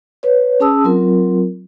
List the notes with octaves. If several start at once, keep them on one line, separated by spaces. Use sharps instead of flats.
B4 C#5
C#4 G#4 A5 D#6 E6
F#3 C4 F4 A#4